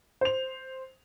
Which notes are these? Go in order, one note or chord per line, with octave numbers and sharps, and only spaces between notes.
C5 F7